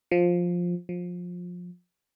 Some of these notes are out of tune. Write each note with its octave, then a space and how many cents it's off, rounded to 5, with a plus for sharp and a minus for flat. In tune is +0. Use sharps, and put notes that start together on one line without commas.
F3 +10
F3 +25